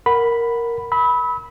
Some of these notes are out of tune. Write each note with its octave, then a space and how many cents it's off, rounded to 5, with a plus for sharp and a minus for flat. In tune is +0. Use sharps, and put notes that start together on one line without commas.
A#4 +0 F#5 +0 B5 +0
B5 -5 E6 -40